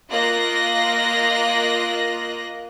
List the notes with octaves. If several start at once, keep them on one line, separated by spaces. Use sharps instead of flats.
A#3 F4 D#5 F#6 A#6